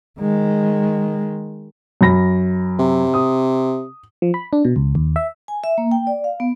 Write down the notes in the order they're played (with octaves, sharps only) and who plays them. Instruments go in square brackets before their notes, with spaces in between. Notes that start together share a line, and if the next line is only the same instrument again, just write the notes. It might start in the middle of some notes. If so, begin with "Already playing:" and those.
[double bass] D#3 G#3
[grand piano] F#2 B5 A#6
[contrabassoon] C3
[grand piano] D#6
[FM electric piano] F3
B5
D4
B2
C#2
D#2
E5
[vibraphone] G#5
E5
A#3
G5
D5
F5
B3